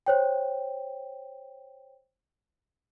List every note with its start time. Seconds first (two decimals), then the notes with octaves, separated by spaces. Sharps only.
0.06 C5 C#5 G5